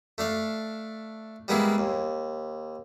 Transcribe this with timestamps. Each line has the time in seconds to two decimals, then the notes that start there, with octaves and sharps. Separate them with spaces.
0.18 A3 D4 F5
1.48 G3 G#3 A#3 B3 E4 G#4
1.78 D#2